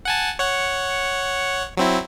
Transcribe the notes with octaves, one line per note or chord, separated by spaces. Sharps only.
F#5 G#5 A5
C#5 F#5
F#3 C4 E4